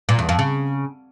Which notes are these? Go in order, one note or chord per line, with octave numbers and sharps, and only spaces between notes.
A#2
E2
F2
C#3